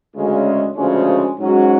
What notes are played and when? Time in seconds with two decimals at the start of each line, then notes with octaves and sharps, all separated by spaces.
0.15 D2 C#3 G#3 C#4
0.76 D2 C#3 F3 G#3 C#4
1.38 G#2 F#3 C#4 F#4